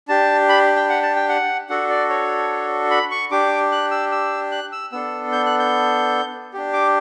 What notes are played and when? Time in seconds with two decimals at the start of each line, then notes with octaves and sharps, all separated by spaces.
0.08 D4 G4 A5
0.49 B5
0.76 G5
0.89 F#5
1.03 A5
1.16 G5
1.29 F#5
1.69 D4 F#4 A4 F#5
1.90 D5
2.10 C#5
2.91 B5
3.11 C#6
3.31 D4 G4 D6
3.72 F#6
3.91 E6
4.12 E6
4.51 F#6
4.72 E6
4.92 B3 D4 A4 E6
5.32 G6
5.46 F#6
5.59 G6
6.53 D4 G4
6.73 D6